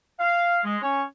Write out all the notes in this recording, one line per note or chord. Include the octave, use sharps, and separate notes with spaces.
F5
G#3
C#4 C#5